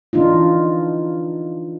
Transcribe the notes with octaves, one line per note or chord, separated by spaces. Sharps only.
E3 D4 D#4 F4